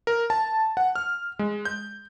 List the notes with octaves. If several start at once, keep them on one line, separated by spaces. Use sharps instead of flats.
A#4
A5
F#5
F6
G#3
G6